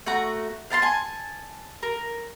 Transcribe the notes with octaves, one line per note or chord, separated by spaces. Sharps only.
A3 F#4 A#5
F5 A5 A#5 C6
G#5 A5
A#4